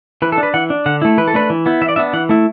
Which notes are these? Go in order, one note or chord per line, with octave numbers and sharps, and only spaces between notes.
E3 B4
A4
D4
B4
E3 F#5
D4
D3 F#5
A3 E4
E3 B4
A4
A3 D4 B4
E3
B3 E4
E3 E5
D5
B3 D4 E5
E3 F#5
A3 E4